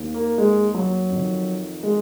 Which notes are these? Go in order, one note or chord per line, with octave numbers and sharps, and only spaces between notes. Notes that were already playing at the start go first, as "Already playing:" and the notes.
Already playing: D#2 D#3
A#3
G#3
F#3
F2 D#3
G#3